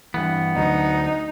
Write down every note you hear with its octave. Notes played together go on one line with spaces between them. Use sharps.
G2 E3 B3
D2 F#3 D#4